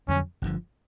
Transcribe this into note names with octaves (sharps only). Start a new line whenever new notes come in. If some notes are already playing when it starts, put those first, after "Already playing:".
F2 D3 F#3 C#4
G1 F#2 D3 F3